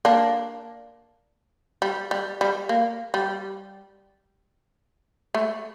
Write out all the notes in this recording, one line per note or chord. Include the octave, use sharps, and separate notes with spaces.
A#3 D4
G3
G3
G3
A#3
G3
A3